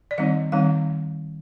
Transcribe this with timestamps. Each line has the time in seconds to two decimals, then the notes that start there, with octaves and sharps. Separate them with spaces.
0.11 D5
0.18 D#3 G3 C4 D#4 D#5
0.52 D#3 G3 C4 D#4 F5